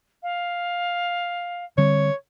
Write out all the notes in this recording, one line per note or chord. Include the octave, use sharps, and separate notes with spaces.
F5
D3 G3 C4 C#5